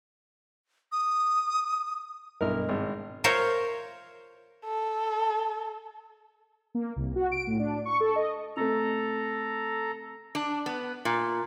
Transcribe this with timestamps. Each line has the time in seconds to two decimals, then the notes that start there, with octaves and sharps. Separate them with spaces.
0.92 D#6
2.41 B1 G2 E4 A#4 D#5 F6
2.69 G#1
3.24 F4 A#4 C5 C#5 E5 F5
4.65 A4
6.75 A#3
6.96 C2
7.16 F#4
7.32 D7
7.47 A2
7.59 D4
7.85 C#6
8.00 A4
8.16 D#5
8.57 C3 A3 A4 A#5
10.35 D4
10.66 B3
11.05 A#2